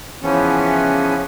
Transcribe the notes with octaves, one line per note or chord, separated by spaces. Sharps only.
C#3 E3 F3 B3 C#4